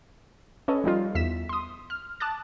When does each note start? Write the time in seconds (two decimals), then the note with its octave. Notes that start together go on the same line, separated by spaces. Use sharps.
0.68 C#4 A4 B4 C#5 D#5
0.84 F3 G3 D#4 F4
1.15 E2 E5 B6 E7
1.49 C6 D#6
1.90 F6
2.20 A5 D6 D#6 F#6 A6